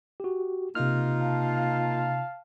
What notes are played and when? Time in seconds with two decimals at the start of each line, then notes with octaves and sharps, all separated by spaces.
0.20 F#4 G4
0.75 C3 A#3 D#4 F4 F6
1.20 F5 A5